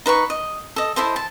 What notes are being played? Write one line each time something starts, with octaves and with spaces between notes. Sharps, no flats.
D#4 B4 F#5 C#6
D#5
A4 D#5
E4 A4 C5 D#5
A5